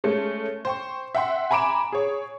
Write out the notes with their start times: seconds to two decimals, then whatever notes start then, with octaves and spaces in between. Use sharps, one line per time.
0.04 G#3 A3 C#4
0.65 C5 G5 C#6
1.15 E5 F#5 G5 C6
1.51 G#5 A#5 B5 D6 D7 E7
1.92 G#4 C#5